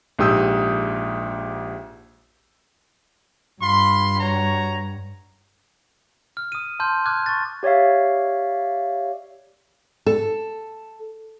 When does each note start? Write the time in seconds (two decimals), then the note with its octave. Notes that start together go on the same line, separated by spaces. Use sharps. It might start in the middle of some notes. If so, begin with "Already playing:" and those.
0.19 A#1 G#2 G4 D#6 E6 G6
3.61 G2 F4 B5 C6
4.20 F#4 C#5 A#5
6.37 F6
6.52 D#6 D#7
6.80 A5 C6 F6 G6
7.06 D6 F6 F#6 G#6
7.26 C#6 A6
7.63 G4 C#5 D5 E5 F5
10.06 A4